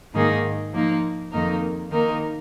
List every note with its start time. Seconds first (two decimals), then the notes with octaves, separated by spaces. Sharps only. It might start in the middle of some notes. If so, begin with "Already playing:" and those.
0.13 G#2 D#3 A#3 D#4 G#4
0.72 F3 A#3 D#4
1.31 F2 D#3 A#3 D#4 A#4
1.90 D#3 A#3 D#4 A#4